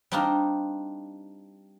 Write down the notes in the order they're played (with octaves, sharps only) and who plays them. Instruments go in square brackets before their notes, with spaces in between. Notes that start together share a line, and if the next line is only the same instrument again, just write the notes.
[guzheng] G3 C4 D4 D#4 F4 G4